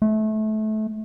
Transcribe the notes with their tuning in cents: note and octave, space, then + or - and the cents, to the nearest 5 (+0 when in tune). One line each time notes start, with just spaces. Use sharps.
A3 -25